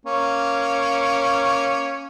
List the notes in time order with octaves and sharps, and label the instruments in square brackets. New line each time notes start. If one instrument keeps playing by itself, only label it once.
[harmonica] A#3 C#4